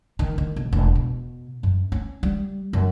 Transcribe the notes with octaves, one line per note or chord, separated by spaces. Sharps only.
D#3
D#3
B1
E1
B2
F#2
C#4
G3
F#2